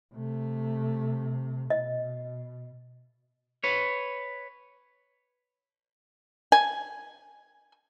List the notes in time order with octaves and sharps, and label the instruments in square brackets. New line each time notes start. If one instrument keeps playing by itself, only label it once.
[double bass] C3 A3
[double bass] B2 [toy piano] D#5
[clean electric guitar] B4 C#5
[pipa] G#5